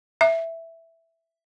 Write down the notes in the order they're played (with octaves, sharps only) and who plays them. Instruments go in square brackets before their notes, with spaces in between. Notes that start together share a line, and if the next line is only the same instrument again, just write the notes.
[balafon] E5